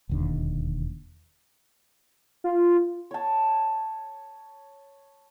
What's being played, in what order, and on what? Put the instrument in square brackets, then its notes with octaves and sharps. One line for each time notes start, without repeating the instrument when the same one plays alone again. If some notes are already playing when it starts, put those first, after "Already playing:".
[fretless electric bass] E1 D#2 D3
[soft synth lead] F4
[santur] C#5 A5